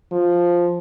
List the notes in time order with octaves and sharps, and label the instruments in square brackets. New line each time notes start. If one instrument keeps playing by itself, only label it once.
[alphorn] F3